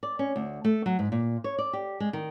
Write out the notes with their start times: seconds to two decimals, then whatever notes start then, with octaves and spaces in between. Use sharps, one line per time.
0.03 D5
0.19 C#4
0.36 D2
0.64 A3
0.86 F#3
0.99 G#2
1.12 A#2
1.44 C#5
1.58 D5
1.73 G4
2.00 G#3
2.13 D#3